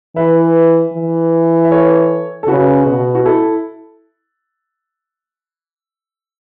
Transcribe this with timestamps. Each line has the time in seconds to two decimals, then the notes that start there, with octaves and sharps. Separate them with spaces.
0.16 E3 B4 E5
0.93 E3
1.65 E5
1.71 A4 C#5
2.43 A4
2.48 C#3 F#4 B4
2.86 B2
3.15 F#4
3.25 E4 A4